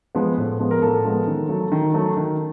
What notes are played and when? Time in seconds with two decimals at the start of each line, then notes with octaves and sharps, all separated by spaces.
0.15 F3 G#3 B3
0.38 A2
0.60 F3 G#3 B3
0.71 A#4
0.82 A2 A4
1.05 F3 G#3 B3
1.27 D#3
1.49 F#3 A3
1.72 D#3
1.94 F#3 A3
2.17 D#3